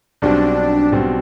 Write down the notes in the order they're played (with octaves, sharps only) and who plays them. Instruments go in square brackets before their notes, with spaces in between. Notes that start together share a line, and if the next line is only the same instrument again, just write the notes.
[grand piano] B1 B2 G3 C4 [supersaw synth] D4
[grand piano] B1 B2 G3 C4